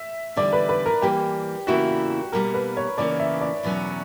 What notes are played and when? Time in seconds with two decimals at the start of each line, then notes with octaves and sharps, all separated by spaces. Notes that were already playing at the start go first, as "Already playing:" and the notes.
Already playing: E5
0.36 E2 D3 G3 D5
0.53 B4
0.69 B4
0.86 A#4
1.02 E3 G3 A#3 G4
1.67 E2 C#3 E3 A#3 E4 F#4
2.32 B2 G3 A#3 A#4
2.54 B4
2.77 C#5
2.98 C#3 E3 A#3 C#4 D5
3.19 E5
3.41 D5
3.63 E2 B2 F#3 C#4 F#4